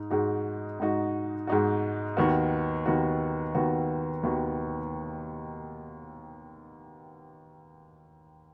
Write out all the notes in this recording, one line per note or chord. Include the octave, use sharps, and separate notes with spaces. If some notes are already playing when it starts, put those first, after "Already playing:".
Already playing: G#2 D#4
G#2 G#3 D#4 F#4
G#2 G#3 D#4 F#4
G#2 G#3 D#4 F#4
D#2 D#3 B3 F#4
D#2 D#3 B3 F#4
D#2 D#3 B3 F#4
D#2 D#3 B3 F#4